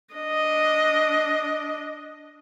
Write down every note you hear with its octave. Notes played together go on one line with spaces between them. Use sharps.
D4 D#5